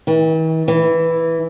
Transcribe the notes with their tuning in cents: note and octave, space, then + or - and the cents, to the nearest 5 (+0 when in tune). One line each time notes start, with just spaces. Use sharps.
E3 -45
E3 -5